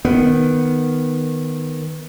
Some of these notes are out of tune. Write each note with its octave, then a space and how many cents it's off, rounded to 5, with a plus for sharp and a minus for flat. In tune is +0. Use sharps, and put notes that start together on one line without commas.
D#3 +0 B3 +0